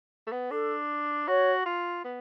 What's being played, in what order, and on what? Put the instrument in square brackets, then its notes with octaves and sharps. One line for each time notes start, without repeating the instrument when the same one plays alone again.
[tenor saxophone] A3
B3
[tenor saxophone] D4 [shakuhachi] A4
[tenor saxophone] F#4 [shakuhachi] C#5
[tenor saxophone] F4
B3